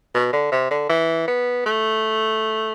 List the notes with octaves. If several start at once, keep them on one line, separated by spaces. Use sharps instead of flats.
B2
D3
C3
D3
E3
B3
A3